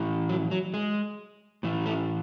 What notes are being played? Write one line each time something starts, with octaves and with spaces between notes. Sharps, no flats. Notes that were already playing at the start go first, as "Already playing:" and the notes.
Already playing: A2 E3
F#3
F#3
G#3
A2 E3
A3